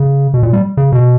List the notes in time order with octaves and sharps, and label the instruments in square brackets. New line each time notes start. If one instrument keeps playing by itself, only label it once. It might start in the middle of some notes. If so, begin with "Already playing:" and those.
Already playing: [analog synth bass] C#3
B2
A#2
G3
C#3
B2